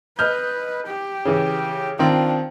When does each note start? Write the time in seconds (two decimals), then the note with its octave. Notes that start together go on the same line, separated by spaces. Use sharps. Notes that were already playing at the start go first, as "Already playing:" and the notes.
0.19 B4 D#5 F6 G6
0.87 G4
1.25 C#3 E3
1.99 D#3 C4 D4 F4